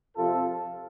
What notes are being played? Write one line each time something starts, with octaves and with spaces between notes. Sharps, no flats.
F2 C3 F3 F4 A4